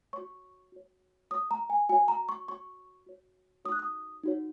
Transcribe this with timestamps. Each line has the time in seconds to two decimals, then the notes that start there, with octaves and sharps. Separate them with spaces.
0.13 F#4 C#5 C#6
0.72 F#4 C#5
1.31 F#4 C#5 D#6
1.51 A#5
1.70 G#5
1.89 F#4 G#5
1.92 C#5
2.08 A#5
2.29 C#6
2.48 F#4 C#5 C#6
3.06 F#4 C#5
3.65 D#4 F#4 C#5 D#6
3.72 F#6
3.79 D#6
4.23 D#4 F#4 C#5